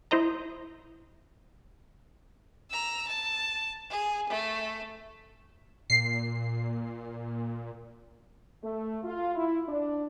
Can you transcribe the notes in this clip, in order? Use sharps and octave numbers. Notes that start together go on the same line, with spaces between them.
E4 C5 D#5 A#5
A#5 E6
A5
G#4
A3
A#2 C7
A3
F4
E4
D4